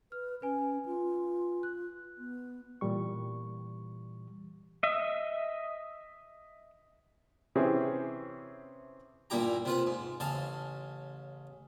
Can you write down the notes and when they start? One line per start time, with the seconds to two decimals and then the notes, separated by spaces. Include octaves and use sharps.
0.12 B4 F6
0.42 C#4 B4 G#5
0.86 F4
1.63 F#6
2.18 B3
2.81 A#2 E3 G3 C#6
4.83 D#5 E5
7.55 C3 E3 C4 C#4 G4 G#4
9.30 G2 A#2 E4 G4 A#5
9.65 C3 F4 B4
9.87 G#2
10.20 A1 C#3 F5 A5